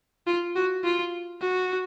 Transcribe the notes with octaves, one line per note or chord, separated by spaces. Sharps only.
F4
F#4
F4
F#4